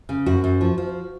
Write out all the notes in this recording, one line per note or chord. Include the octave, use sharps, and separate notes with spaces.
C#3
F#2 F#4
F#2
F3
F3